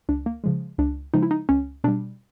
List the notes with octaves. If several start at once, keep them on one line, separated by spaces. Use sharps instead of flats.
C#2 D4
A#3
C#3 F3 G#3
C#2 D4
C#3 F3 G#3 D#4
E4
D#4
C#2 C#4
B2 G3 D4